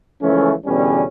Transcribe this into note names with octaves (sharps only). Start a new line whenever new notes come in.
C#2 E3 F3 A3 A#3 C#4
E2 B2 D3 G3 C#4